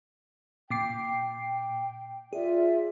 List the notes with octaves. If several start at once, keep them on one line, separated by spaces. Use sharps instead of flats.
A#2 G5 D6 C7
G5
F4 G#4 D5 E5